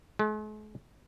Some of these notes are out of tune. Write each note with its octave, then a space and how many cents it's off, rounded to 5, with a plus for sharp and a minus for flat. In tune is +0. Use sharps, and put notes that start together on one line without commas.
G#3 +45